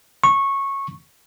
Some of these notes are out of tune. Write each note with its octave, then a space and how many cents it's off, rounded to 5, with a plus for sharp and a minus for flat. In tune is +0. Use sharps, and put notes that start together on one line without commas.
C#6 -15